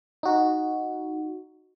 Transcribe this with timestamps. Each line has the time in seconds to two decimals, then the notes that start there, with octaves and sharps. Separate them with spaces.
0.23 D#4 F#4